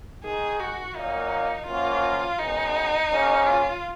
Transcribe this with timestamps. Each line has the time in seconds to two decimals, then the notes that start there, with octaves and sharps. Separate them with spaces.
0.23 D#3 G#3 D#4 G#4
0.60 F#4
0.96 A#2 F#3 A#3 D#4
1.67 F#2 F3 A#3 C#4 F4 F#4
2.39 F#2 D#3 G#3 B3 D#4
3.10 G#2 F#3 A#3 C#4
3.46 F4